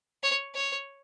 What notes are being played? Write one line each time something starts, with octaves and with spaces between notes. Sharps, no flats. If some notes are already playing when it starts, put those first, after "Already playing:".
C#5
C#5